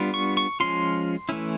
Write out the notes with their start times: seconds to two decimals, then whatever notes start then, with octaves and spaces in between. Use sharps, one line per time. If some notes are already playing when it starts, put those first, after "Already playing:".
Already playing: G3 B3 D4 F4
0.14 C#6
0.37 C#6
0.60 F3 G#3 C#4 F4 C6
1.29 E3 A3 C#4 E4